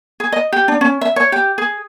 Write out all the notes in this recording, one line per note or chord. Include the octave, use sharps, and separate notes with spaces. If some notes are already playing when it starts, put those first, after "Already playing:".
G#4
D#5
G4
D4
C#4
E5
C#5
G4
G#4